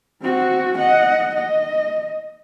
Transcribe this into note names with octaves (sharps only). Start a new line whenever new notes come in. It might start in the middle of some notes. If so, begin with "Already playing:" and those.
C4 F#4
D#5 F#5
D#5